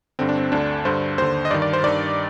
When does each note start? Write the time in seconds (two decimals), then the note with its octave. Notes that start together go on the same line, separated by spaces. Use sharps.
0.19 G2 D3 C4
0.29 D4
0.38 C4
0.52 D2 D3 D4
0.85 G2 D3 C5
1.18 D#2 D3 C5
1.45 D#5
1.51 G2 D#3 D5
1.62 D5
1.73 C5
1.84 G2 D#3 D5